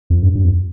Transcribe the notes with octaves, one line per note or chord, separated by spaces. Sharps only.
F2
G2
G2
F2